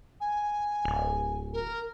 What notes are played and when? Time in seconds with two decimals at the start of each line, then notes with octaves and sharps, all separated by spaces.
0.20 G#5
0.85 D1
1.53 A#4